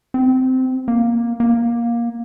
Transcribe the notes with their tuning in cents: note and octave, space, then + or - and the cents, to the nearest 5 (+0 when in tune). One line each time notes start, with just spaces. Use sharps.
C4 -15
A#3 +10
A#3 +15